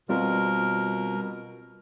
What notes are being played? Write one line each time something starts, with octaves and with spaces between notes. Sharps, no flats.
B2 G3 C4 F4 A#4